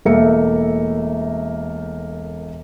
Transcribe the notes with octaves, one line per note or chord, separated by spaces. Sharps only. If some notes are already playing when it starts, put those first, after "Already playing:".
E1 A3 A#3 E5 C#7